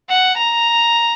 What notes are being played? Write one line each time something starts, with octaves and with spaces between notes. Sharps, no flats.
F#5
A#5